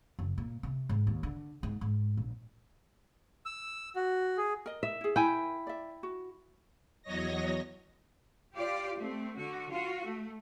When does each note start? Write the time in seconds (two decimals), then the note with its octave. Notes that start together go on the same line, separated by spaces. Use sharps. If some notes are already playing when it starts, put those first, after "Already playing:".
0.19 F#1
0.38 A#2
0.63 C3
0.89 G#2
1.07 D#2
1.23 D3
1.63 G#2
1.81 G#2
2.17 A#1
3.46 E6
3.96 F#4
4.37 G#4
4.66 A#4 D#5
4.83 E5
5.01 E4 G#4
5.16 E4 A#4 G5 G#5 B5
5.67 D5 E5
6.03 F#4
7.03 E2 F#3 C#5 D#5 A#6
8.55 F4 G4 D5
8.98 A3 C4
9.37 D3 F#4
9.71 F4 F#4
10.05 A3